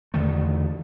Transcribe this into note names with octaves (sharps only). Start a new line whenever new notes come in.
E2 D3 D#3 A3